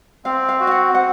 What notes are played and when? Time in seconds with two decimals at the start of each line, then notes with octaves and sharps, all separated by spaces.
0.25 C4 F5
0.49 F5
0.60 F#4
0.67 F5
0.71 F#5
0.94 C4 F#5